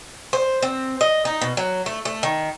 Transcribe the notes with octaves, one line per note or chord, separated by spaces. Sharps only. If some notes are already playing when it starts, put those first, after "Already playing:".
C5
C4
D#5
D#4
B2
F#3
A3
A3
D#3